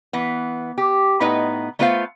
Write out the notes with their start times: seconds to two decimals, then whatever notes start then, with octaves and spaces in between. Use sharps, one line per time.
0.13 E3 B3
0.78 G4
1.20 A2 B3 D#4 B4 D#5
1.79 A3 B3 F4 B4 C5 F5